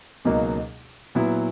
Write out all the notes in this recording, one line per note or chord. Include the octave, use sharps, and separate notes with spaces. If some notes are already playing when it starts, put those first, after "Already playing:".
C#2 B2 F#3 A#3 D#4
A#2 F#3 B3 E4